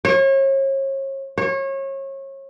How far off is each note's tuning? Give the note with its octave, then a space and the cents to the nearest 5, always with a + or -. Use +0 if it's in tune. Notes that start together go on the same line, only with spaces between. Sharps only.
C#5 -35
C#5 -30